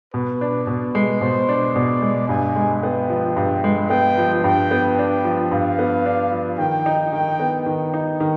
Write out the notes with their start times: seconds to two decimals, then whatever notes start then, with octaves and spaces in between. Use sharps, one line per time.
0.14 B2 B4
0.41 D4
0.67 B2 B4
0.95 G#3
1.21 B2 C5
1.49 D4
1.75 B2 D5
2.02 G#3
2.28 G2 G#5
2.56 G#3
2.82 B3 G5
3.10 F3
3.36 G2
3.64 G#3
3.90 B3 G5
4.18 F3
4.44 G2 G5
4.71 B3
4.98 D4 G5
5.25 F3
5.51 G2 F5
5.79 B3
6.05 D4
6.32 F3
6.59 D#3 G5
6.86 D#4
7.13 D#3 G5
7.40 B3
7.66 D#3
7.94 D#4
8.20 D#3